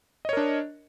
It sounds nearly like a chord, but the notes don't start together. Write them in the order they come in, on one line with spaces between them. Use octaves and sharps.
D#5 C#5 A#4 D4